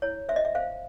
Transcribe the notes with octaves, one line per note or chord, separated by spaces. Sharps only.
E4 C#5
C5 E5
D#5
E5
C5 F5